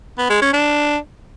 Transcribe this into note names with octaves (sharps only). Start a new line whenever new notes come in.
B3
G#3
C#4
D4